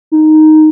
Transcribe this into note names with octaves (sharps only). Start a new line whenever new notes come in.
D#4